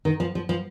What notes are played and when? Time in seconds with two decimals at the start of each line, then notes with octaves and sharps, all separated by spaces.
0.05 D#3
0.20 F3
0.35 F3
0.49 F3